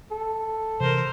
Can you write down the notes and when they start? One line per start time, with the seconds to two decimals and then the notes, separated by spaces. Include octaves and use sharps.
0.11 A4
0.81 C3 E3 A#4 C5